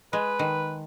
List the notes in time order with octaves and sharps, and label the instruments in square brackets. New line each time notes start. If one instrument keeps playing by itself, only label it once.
[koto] G#3 [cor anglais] B4
[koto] D#3